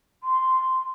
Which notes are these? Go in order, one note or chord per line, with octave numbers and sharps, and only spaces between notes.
C6